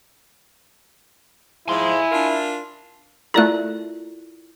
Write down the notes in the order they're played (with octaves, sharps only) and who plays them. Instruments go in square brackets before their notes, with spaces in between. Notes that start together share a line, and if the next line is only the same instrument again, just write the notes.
[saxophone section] G#2 F3 [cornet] E4 [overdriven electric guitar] G#5 C6
[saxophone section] D4 F4 A#4
[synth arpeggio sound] A3 A#5 [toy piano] E4 F4 A#4 [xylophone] A4 D5 F#6